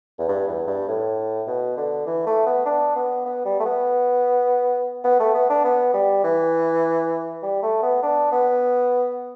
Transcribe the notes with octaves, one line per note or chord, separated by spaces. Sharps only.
E2
G2
E2
G2
A2
B2
D3
E3
A3
B3
D4
B3
B3
G3
A3
B3
B3
A3
B3
D4
B3
G3
E3
G3
A3
B3
D4
B3